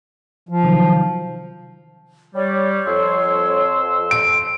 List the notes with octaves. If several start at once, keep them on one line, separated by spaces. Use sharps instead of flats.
F3
C3 D#3 F#3
G3 C#5
F2 C6 E6
D7